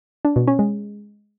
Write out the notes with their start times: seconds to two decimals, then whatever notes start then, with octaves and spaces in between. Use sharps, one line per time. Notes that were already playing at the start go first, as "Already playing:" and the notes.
0.25 D4
0.36 B2
0.47 C#4
0.59 G#3